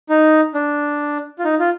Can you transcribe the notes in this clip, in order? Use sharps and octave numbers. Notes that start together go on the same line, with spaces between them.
D#4
D4
F4
D#4
F4